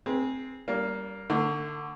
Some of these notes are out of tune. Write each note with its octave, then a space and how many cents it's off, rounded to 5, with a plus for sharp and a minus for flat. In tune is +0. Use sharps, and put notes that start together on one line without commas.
C4 +0 G#4 +0 B4 -45
G3 -15 A#3 +0 C#4 +45
D3 +10 A3 +40